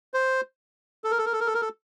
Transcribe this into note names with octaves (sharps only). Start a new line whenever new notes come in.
C5
A4
A#4
A4
A#4
A4
A#4
A4
A#4
A4